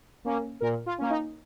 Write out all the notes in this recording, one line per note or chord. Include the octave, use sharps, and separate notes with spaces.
A#3 C#4
A#2 A#4
F4
A#3 C#4
D#4